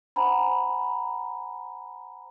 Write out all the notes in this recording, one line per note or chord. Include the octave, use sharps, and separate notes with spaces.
C5 F#5 G#5 A#5 B5